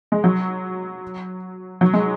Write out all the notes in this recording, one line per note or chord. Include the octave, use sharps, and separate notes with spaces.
G#3
F#3
F#3
G#3